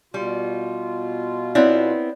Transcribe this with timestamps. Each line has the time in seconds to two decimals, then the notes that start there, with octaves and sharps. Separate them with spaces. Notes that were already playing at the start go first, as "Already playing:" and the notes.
0.14 B2 G3 F4
1.55 B3 C4 E4 C#5 D5